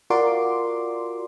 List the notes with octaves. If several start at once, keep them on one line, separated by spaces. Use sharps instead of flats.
F4 F#4 A#4 D5 C6 D6